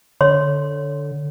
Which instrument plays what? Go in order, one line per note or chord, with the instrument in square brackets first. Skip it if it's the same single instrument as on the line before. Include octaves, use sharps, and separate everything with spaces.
[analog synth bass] D3 [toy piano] C#5 C6